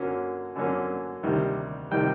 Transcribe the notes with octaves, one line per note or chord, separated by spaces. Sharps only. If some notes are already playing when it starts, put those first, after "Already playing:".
Already playing: F#2 D3 F#3 A#3 C#4
F#2 D3 F#3 A#3 C#4
D2 C3 D#3 G3
C3 D#3 G3 G5